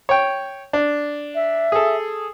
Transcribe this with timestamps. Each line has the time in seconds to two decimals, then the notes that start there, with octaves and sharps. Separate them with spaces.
0.09 C#5 G5
0.73 D4
1.35 E5
1.72 G#4 A4